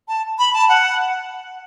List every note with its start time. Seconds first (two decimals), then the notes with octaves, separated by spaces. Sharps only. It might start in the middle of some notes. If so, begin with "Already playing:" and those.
0.08 A5
0.39 B5
0.54 A5
0.69 F#5